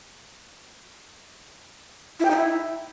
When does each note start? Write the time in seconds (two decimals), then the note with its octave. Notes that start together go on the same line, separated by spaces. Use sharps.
2.20 E4
2.25 G5
2.30 D#4
2.36 E4